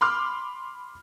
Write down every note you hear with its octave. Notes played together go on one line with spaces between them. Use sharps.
B5 C6 D6 F6